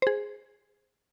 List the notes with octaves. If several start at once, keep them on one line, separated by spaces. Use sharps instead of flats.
G#4 C5